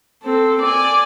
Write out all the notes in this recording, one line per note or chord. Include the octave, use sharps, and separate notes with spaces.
C4 A4
D5 G#5